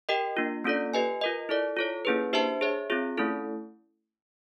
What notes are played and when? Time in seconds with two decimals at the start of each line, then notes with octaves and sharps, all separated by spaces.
0.09 G4 A#4 D#5 G5
0.37 A#3 D4 F4
0.65 A#3 C#4 F4 A4 D5
0.94 G4 B4 D#5 G#5
1.21 F4 A#4 D#5
1.49 E4 A4 D5
1.77 F4 A4 C#5
2.05 A#3 C#4 E4 G#4 B4
2.33 D4 G4 C5 E5 A5
2.61 G#4 C#5 E5
2.90 C4 F4 G#4
3.17 A3 C#4 E4 A4